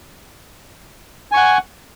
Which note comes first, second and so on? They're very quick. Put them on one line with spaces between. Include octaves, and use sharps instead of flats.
G#5 C#6 F#5